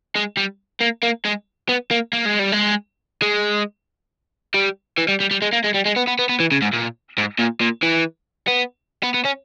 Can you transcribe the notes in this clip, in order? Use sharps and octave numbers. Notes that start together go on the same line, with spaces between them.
G#3
G3
A#3
A#3
G#3
B3
A#3
A#3
G#3
G3
G#3
G#3
G3
E3
G3
G3
G3
G#3
A#3
G#3
G3
G#3
B3
B3
B3
B3
E3
C#3
G#2
A#2
G#2
A#2
A#2
E3
B3
B3
B3
C#4